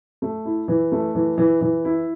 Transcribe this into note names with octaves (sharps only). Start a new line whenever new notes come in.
A3
E4
E3
A3
E3
E3
E3
E4